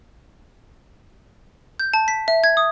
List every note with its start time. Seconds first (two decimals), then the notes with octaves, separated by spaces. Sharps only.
1.79 G6
1.94 A5
2.08 B6
2.28 E5
2.44 G#6
2.57 D#6